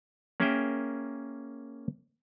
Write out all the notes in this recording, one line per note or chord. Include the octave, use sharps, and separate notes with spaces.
A#3 C#4 G#4 A#4 E5 G5